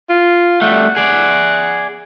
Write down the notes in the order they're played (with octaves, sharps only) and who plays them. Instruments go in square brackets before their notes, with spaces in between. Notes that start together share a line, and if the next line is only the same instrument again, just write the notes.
[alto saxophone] F4
[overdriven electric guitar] G3 A3 [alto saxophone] F#5
[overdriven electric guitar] G#4 D5